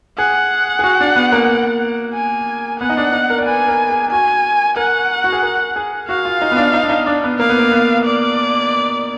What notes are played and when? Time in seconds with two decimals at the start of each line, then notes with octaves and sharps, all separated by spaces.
0.18 G#4 F#5
0.79 G#4
0.84 F#4
1.00 D4
1.16 B3
1.32 A#3
2.14 G#5
2.80 B3 F#5
2.90 D#4
2.97 D4
3.13 D#4
3.30 A#4
3.38 D5
3.46 B4 G#5
3.68 A#4
3.89 G#4
4.11 F#4 G#5
4.76 A#4 F#5
5.24 F#4
5.32 G#4
5.42 A#4
5.76 G#4
6.08 F#4 F5
6.25 F4
6.42 D#4
6.51 B3
6.57 D4
6.73 D#4
6.83 D4
6.90 D#4
7.06 D4
7.24 B3
7.39 A#3 F5
7.49 B3
7.58 A#3
7.72 B3
8.05 D5